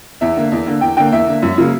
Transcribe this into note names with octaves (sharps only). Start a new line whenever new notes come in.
E2 E5
D3 A#3
E2
D3 A#3
E2 G5
D3 A#3 G5
E2 E5
D3 A#3
F#2
C#3 F#3 A#3